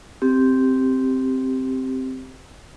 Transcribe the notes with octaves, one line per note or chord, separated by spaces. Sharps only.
C4 G4